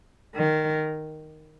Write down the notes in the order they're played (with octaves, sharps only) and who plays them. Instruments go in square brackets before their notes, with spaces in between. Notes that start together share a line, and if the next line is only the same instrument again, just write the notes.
[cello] D#3